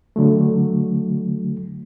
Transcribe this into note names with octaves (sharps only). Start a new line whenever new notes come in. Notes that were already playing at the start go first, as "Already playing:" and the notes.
D3 F#3 A3